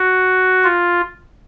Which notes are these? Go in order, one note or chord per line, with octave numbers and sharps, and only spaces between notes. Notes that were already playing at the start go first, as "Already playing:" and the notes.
Already playing: F#4
F4